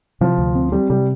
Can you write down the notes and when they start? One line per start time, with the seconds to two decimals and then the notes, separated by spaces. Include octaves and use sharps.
0.21 C3 F3
0.38 D2
0.55 C4
0.72 G3 C4
0.90 C3 G3